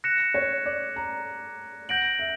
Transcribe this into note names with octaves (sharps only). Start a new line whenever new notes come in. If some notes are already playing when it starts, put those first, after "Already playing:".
F#6 A#6 C#7 E7
C#5
D5
A#5
F#5 G6 A#6 D7 F#7
E5